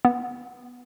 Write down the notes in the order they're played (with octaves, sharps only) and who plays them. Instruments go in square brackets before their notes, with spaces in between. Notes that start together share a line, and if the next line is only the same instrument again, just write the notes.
[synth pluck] B3